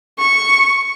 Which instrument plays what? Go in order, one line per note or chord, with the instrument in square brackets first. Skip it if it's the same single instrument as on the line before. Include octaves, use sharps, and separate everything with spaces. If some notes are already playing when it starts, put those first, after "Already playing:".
[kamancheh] C#6